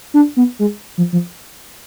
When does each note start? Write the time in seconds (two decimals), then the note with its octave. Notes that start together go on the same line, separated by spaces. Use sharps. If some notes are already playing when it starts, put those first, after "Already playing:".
0.14 D4
0.37 B3
0.59 G#3
0.98 F3
1.13 F3